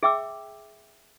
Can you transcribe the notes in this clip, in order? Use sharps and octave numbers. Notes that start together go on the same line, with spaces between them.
G#4 E5 G5 D6 E6